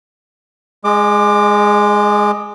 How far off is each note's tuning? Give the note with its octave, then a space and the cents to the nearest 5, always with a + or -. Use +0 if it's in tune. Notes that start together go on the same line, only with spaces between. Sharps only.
G#3 +0 D#5 -35 D6 +20